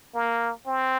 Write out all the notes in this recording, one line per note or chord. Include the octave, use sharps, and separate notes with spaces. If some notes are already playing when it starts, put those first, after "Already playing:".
A#3
C4